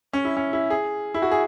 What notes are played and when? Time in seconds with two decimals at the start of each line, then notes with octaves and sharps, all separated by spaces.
0.13 C#4
0.25 E4
0.37 C#4
0.53 E4
0.70 G#4
1.14 E4
1.22 F#4
1.31 G#4